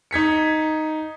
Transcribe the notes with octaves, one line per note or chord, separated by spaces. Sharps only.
D#4 G#6 B6 C#7